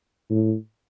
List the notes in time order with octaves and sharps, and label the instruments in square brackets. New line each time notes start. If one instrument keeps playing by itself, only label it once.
[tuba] A2